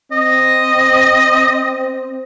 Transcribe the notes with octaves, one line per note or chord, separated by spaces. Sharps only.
C4 D#5